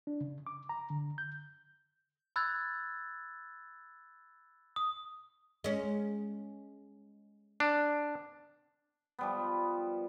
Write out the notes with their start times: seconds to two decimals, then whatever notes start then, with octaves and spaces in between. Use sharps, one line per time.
0.07 D4
0.21 C#3
0.47 D6
0.69 A#5
0.90 D3
1.18 G6
2.36 B5 E6 F#6 G#6 A6
4.76 D#6
5.64 G#3 C#4
7.60 D4
9.19 F3 G3 B3